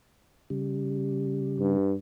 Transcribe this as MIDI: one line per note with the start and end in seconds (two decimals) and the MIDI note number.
0.50 1.77 49
0.50 1.77 55
1.60 1.94 43